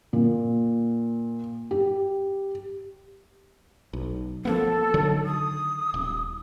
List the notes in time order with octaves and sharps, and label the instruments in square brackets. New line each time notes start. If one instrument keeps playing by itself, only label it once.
[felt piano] A#2
G4
[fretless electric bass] B1
[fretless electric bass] F3 A#3 B3 [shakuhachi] A4
[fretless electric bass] D3 D#3 F#3
[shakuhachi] D#6
[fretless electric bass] D#1